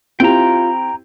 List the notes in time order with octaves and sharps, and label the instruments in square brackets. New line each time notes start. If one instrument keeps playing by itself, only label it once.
[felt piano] C4 E4 G4 [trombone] F4 [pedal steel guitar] G5 A#5